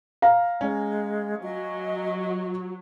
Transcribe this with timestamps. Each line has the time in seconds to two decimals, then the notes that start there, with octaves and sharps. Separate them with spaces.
0.22 F5 A#5
0.61 G#3 C#4
1.43 F#3 D#5